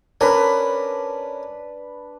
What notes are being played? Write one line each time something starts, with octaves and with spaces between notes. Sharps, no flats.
C#4 D4 A#4 B4